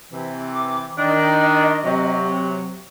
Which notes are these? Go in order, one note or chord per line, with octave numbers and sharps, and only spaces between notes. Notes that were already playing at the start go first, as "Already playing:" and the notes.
C3 E3
D6
D#3 D4 D#5
C3 F#3